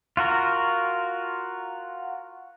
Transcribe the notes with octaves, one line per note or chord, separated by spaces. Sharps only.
F4 F#4 A#4